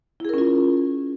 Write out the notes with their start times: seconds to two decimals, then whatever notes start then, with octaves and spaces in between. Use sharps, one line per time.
0.20 E4
0.25 G#4
0.29 A#4
0.34 C#4
0.38 F4